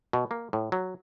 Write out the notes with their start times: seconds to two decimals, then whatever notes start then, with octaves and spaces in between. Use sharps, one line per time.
0.13 B2
0.31 A#3
0.53 A2
0.72 F#3